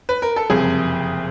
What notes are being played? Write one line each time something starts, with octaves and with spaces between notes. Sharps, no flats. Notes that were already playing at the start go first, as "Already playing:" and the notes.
B4
A#4
A4
F#1 F2 C3 G#4